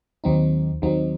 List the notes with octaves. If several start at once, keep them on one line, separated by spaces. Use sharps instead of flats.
D#2 D#3 F#3 C4 D#4
D#2 D#3 F#3 C4 D#4